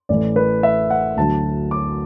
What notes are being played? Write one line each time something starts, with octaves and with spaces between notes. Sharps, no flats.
A1 A2 E3 A3 D5
B4
E5
F#5
D2 D3 F#3 A5
D6